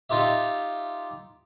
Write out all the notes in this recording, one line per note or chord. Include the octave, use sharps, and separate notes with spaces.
D#4 F4 G4 E5